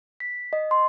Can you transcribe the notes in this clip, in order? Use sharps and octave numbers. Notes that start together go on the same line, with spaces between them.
B6
D#5
C6